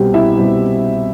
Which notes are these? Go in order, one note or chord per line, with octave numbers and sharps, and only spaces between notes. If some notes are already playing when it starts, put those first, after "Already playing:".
Already playing: C2 B2 G3 C4 G4
E4 E5
C2 B2 G3 C4